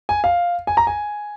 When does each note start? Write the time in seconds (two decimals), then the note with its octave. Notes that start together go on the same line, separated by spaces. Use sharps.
0.09 G#5
0.24 F5
0.67 G#5
0.77 A#5
0.87 G#5